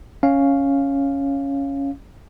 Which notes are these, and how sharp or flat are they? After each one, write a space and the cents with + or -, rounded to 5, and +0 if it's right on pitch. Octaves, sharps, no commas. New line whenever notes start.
C#4 +0 F5 +0